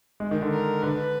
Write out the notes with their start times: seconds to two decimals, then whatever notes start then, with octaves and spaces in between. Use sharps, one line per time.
0.20 G#3
0.31 D#3
0.42 D3
0.52 A#4
0.83 D3 B4